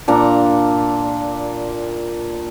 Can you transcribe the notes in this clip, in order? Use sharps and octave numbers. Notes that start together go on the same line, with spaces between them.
A#2 D4 A#5